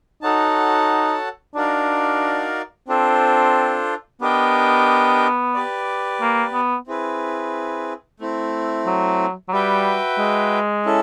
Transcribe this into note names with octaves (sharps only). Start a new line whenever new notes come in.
D#4 F#4 A4 C#5 F#5 A5
D4 D#4 F#4 A#4 D5 F5
C4 D4 F4 A4 C5
B3 D4 G4 A#4 D#5 G5
G4 B4 D5
A#3
B3
C4 E4 G#4 B4
A3 C4 E4
F#3
F#3
G3 F#4 B4 E5 G5
G#3
C#4 E4 A4